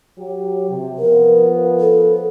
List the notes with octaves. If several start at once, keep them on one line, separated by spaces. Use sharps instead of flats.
F#3 G4
C3
F3 B3 A#4
A4